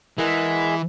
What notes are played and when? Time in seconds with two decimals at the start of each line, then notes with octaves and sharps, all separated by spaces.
0.18 E3 G#3 E4 G#4 A#4 E5 F#5